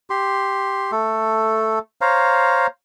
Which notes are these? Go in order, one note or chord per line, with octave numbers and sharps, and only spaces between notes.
G4 C6
A3 A4
C5 C#5 F5 A#5